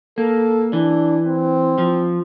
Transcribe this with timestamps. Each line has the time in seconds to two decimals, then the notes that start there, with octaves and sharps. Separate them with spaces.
0.18 A#3 A4
0.73 E3 D4
1.26 C4
1.78 F3